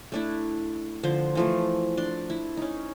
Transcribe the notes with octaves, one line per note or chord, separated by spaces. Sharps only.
A3 D4 E4
D3 F3 C5
E3 F3 A3
D4 C6
E4
C#4 D#4